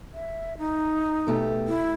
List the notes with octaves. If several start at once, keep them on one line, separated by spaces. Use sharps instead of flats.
E5
D#4
B2 A3 G4
E4